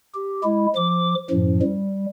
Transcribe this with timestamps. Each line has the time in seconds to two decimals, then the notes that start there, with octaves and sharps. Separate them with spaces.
0.15 G4
0.44 G#3 E4
0.76 F3 D6
1.30 F#2 A2 F3
1.62 G3